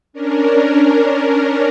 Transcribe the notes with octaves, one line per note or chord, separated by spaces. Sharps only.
C#4 D4 A#4